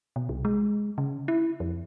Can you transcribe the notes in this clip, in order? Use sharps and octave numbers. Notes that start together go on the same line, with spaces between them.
B2
C2
G#3
C#3
E4
F2